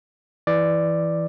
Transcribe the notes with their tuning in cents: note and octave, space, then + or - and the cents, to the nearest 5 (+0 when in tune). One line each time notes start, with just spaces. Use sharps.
E3 +0 D5 +5